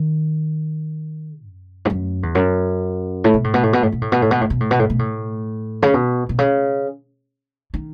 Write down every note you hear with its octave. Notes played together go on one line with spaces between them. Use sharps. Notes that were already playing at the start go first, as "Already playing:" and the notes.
Already playing: D#3
F#2
G#2
F#2
E2
F#2
A2
B2
A2
B2
A2
B2
A2
B2
A2
B2
A2
B2
A2
B2
A2
B2
A2
B2
A2
C#3
B2
B2
C#3
D#3